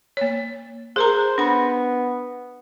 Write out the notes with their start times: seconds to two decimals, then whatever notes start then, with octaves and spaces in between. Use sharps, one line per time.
0.17 A#3 C#5
0.96 G#4 A#4 C5 A#5
1.38 B3 D4 B5